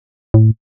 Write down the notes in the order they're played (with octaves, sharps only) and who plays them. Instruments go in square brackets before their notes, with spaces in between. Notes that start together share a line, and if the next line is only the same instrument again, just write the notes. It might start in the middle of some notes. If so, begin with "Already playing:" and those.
[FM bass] A2